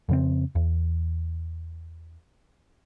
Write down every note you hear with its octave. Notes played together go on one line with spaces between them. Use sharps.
F2 C#3 C4
E2